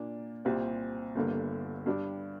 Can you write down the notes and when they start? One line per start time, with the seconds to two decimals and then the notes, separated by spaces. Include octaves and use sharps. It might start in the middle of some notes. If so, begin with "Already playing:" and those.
Already playing: A#2 A#3 D4
0.45 C2 A#2 G3 C4
1.15 G1 G2 D3 A#3
1.86 G2 G3 D4 G4